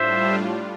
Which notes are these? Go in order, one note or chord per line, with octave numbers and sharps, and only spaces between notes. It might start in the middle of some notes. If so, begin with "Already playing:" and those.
Already playing: A2 G3 D4 F4 C5 E5